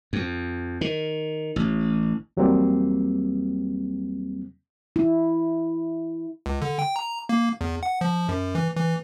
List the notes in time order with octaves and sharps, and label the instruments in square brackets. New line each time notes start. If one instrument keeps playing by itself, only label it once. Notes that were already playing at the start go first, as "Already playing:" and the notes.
[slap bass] F2
D#3
A1
[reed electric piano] E2 F#3 G3 A#3 C4
[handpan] E4
[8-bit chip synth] C#2
D3
G5
A#5
A#3
E2
F#5
F3
F#2
E3
E3